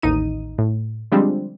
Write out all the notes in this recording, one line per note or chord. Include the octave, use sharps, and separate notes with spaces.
A1 D#2 D#4 D#7
A2
D3 F3 G3 G#3 C4 D4